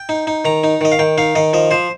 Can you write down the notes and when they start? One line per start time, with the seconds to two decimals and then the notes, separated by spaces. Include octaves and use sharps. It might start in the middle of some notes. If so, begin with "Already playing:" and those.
Already playing: G5
0.09 D#4
0.27 D#4
0.45 D#3 A#5
0.64 D#4
0.81 D#3 D#5
0.92 F5
0.99 D#3 G5
1.18 D#4 F5
1.35 D#3 D#5
1.53 F3 D#5
1.71 F3 C5